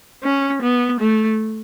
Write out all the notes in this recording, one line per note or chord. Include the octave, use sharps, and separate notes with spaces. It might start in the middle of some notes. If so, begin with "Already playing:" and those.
C#4
B3
A3